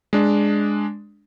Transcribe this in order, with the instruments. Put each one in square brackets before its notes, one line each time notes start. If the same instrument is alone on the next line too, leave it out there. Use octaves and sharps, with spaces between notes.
[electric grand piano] G#3 D4